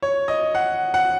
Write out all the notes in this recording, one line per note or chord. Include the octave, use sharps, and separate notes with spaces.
C#5
D#5
F#5
F#5